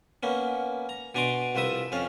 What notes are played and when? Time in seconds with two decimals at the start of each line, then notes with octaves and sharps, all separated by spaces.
0.23 A#3 B3 C#4
0.89 A#5
1.15 B2 D4 G#5 A#5 C6 D6
1.55 C2 F3 B4 E5 D#6
1.92 F2 C#4 F5